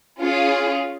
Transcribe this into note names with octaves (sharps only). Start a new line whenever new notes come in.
C#4 F4 G#4